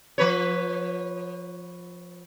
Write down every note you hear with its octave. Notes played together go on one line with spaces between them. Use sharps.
F3 B4 C#5